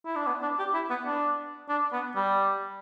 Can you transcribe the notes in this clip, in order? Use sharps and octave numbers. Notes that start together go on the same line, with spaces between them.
E4
D4
B3
D4
G4
E4
B3
D4
D4
B3
G3